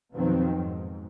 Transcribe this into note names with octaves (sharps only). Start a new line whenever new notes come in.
F2 B2 D#3 F3 F#3 C4
G#2